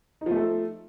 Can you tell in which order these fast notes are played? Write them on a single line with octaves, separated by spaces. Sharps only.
D#4 F3 A3 A4